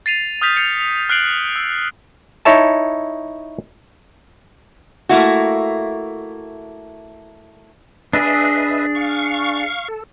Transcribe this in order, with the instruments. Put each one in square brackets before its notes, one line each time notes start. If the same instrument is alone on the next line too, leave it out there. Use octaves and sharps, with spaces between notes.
[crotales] A6 C7 D#7 F7
D#6 F6 G6 B6 F7
G6 C7 C#7 F7
F6 F#6 C7 D7 F#7
E6
[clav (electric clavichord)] D#4 E4 C#5 E5 A5
[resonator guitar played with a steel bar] A3 A#3 E4 F#4
[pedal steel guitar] D4 G#4 [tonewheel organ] B4 D#5 E5
[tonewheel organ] F5 C#6
A4